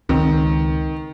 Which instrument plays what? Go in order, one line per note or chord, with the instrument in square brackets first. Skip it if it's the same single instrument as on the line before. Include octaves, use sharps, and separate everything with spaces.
[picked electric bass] C#2 C4 [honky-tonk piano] D#3